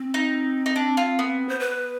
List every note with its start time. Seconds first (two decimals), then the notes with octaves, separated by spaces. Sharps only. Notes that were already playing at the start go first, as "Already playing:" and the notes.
Already playing: C4
0.14 D#4
0.66 D#4
0.76 D4
0.97 F4
1.19 B3
1.49 C5
1.60 B4